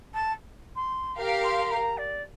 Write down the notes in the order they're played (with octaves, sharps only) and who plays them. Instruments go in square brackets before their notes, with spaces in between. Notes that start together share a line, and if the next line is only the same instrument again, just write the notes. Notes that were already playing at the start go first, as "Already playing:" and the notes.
[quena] A5
C6
[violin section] G4 A#4 F5
[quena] C6
A#5
D5